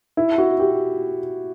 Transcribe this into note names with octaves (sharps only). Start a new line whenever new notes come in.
E4
F#4
G4